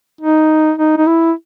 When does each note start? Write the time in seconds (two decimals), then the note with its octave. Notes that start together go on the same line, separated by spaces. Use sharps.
0.21 D#4
0.78 D#4
0.97 D#4
1.07 E4